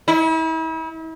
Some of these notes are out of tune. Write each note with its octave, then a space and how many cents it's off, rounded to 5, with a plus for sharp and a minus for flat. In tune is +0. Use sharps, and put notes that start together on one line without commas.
E4 -40